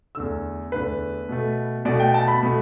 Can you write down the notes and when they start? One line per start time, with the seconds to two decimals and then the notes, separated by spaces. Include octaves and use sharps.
0.15 E2 D3 A3 E6
0.72 E2 D3 A3 B4
1.29 B2 A3
1.85 B2 A3 D5
2.00 G5
2.14 A5
2.28 B5
2.43 B2 A3